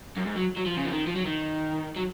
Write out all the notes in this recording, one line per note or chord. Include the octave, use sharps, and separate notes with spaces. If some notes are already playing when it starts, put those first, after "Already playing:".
F#2
G#2
F#3
F#3
F3
C#3
F3
D#3
F3
F#3
D#3
F#3